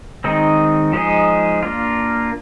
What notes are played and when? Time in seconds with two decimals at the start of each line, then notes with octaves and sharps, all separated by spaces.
0.24 D#3 G#3 C4 D#4
0.93 F3 G#3 D#4 G#4
1.63 A#3 D4 F4